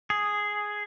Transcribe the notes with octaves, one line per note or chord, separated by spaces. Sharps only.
G#4